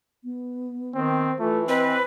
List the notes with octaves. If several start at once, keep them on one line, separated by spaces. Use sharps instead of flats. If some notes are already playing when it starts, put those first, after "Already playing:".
B3
D#3 C4
E3 A3 F4
C4 B4 D#5